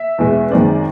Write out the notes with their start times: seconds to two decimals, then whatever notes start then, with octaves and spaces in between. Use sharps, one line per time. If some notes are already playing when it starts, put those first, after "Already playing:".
Already playing: E5
0.18 E2 B2 G#3
0.51 F#2 D#3 G#3 C4 D5